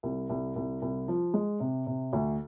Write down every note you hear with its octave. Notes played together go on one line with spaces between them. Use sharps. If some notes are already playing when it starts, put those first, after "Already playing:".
C2
C2
C2
C2
F3
G#3
C3
C3
D2